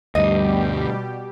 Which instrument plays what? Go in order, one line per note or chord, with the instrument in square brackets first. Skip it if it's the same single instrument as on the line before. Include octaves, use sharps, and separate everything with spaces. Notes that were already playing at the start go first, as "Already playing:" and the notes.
[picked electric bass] D2 G2 [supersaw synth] B2 G3 G4 [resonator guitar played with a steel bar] D#5